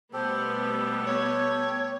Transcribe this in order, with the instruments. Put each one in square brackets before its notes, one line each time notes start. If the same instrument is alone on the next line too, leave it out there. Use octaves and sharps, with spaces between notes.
[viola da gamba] B2 G3 A3 [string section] B3 [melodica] G4 A4 [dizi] C5
[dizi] C#5